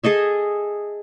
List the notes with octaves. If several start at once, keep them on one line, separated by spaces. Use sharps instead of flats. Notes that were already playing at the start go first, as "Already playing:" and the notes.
G#4 A4 D#5 E5